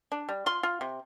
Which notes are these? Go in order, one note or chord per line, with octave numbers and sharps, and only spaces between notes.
D4
G3
F4 C6
F4
C3